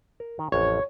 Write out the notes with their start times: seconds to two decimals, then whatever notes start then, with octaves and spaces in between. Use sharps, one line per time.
0.20 A#4
0.39 D#3
0.52 A1 F2 C#5